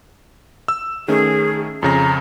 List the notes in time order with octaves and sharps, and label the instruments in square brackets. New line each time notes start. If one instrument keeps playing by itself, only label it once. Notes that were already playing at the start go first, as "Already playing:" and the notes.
[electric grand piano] E6
[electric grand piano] D#3 A3 C#4 [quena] G#4
[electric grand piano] F2 C#3 A#6 [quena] A#5